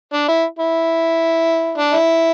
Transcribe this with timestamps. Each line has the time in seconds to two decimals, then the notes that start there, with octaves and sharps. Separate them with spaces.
0.14 D4
0.28 E4
0.59 E4
1.78 D4
1.93 E4